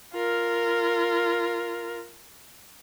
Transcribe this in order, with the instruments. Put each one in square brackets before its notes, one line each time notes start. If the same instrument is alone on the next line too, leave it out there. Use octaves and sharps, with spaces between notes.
[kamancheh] F4 A#4